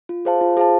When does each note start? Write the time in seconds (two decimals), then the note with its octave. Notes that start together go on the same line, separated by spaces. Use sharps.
0.09 F4
0.25 G#4 C5 F5 A5
0.41 F4
0.57 G#4 C5 F5 A5